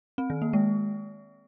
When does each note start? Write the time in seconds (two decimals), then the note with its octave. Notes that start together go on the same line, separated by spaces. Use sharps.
0.18 C4
0.30 D#3
0.42 A#3
0.53 G#3